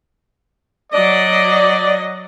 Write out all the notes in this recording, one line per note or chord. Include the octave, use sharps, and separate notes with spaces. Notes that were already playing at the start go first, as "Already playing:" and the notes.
F#3 D5 D#5